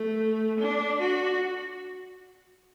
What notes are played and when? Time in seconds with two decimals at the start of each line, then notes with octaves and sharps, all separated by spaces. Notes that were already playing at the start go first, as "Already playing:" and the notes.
Already playing: A3
0.60 D4
1.00 F#4